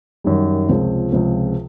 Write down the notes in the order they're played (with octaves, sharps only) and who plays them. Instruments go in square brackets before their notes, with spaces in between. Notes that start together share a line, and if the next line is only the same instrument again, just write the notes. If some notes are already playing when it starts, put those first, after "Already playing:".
[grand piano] F#2 D#3 G3
C#2 C3 F3 G#3 C4
C#2 C3 F3 G#3 C4